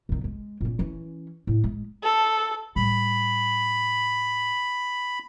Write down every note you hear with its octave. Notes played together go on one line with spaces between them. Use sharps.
A#1 D#3
G#3
A#2 C#4
E3 C#4
A2
G#3
A4
A2 G3 B5